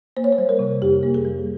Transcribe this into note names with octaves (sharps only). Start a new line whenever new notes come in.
A#3 C5
C#5
C5
G3
A#4
C3
F2 G4
A#3
G#4
G3